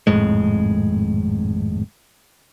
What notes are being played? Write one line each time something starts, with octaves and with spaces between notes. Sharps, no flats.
G#1 F2 A2 G#3